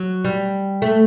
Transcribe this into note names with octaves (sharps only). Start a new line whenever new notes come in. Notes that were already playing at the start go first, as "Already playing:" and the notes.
Already playing: F#3
G3
A3